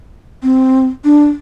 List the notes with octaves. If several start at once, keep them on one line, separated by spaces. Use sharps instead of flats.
C4
D4